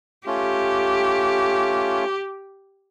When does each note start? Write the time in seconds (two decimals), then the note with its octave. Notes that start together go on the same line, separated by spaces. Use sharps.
0.27 A3 C#4 F4 G4